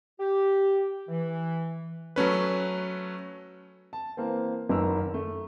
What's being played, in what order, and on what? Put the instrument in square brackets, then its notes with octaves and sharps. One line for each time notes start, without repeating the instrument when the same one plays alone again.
[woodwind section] G4
E3
[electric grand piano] F#3 A3 C#4 B4
[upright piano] A5
E3 A#3 C4
F#1 F#2 D#3 A#4 B4 E6
A3